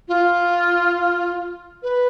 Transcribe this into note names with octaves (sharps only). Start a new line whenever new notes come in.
F4
B4